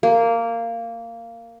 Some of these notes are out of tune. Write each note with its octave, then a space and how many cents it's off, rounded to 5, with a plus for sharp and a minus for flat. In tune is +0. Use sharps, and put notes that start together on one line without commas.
A#3 -15